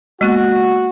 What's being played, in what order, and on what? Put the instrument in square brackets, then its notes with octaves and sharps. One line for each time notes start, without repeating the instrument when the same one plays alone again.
[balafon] G#3 A#3 B3 [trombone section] F#4